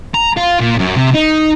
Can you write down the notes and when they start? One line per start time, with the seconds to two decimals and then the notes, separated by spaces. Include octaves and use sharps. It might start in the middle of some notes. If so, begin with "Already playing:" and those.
0.14 A#5
0.37 F4
0.60 A#2
0.79 F#2
0.96 C3
1.14 D#4